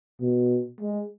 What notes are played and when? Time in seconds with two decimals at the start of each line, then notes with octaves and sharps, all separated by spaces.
0.21 B2
0.81 G#3